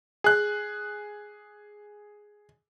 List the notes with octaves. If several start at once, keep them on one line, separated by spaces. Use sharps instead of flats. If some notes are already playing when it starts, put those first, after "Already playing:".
G#4 F#6